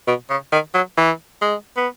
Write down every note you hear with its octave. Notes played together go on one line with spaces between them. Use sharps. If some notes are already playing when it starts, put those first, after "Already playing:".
B2
C#3
D#3
F#3
E3
G#3
B3